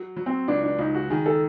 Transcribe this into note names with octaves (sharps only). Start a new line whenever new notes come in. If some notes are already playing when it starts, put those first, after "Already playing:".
Already playing: F#3
F#3
C4
C#2 D4
D4
C#2 D#4
F#4
D#3 G#4
A4